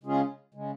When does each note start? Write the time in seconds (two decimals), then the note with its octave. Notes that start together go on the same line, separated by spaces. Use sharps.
0.03 C#3 G#3 C#4 F4 G#4
0.54 C#3 G#3